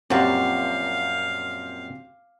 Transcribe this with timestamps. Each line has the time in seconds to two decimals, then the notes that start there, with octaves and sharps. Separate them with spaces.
0.10 F#2 A#2 F3 C4 F#4 G4 F5 A5